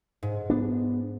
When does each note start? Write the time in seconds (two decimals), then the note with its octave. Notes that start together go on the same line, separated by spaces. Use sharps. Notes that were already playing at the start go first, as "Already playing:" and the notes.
0.23 G#2
0.50 B3 D4